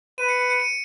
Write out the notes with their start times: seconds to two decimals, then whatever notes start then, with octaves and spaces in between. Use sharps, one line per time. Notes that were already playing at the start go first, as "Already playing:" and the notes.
0.18 B4 D#7
0.29 C#7
0.39 C#7
0.50 C#7
0.60 D#7